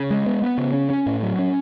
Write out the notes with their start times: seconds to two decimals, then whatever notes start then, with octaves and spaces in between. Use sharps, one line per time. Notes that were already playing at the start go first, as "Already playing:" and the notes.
Already playing: C#3
0.10 G#3
0.26 B3
0.42 B3
0.58 C#3
0.74 C#4
0.90 C#4
1.06 A2
1.23 F#3
1.39 C#4